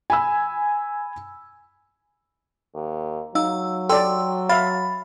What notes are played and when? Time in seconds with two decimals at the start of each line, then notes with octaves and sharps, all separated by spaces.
0.10 G#5 B5 E6
2.75 D#2
3.35 F#3 D#4 F5 E6
3.89 A4 D5 G5 C6 E6
4.49 E5 F5 B5 A6